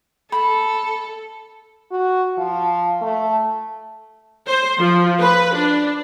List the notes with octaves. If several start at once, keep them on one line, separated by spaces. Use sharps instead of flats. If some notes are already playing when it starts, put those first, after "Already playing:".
A4 B5
F#4
F3
A3
C5
F3
B4
D4